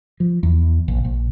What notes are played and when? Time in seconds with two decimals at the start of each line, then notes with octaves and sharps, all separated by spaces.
0.20 F3
0.43 E2
0.88 A#1
1.05 A#1